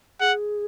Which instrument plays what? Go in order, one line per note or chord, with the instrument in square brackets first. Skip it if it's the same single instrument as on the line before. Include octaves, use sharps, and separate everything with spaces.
[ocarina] G#4 [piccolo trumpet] F#5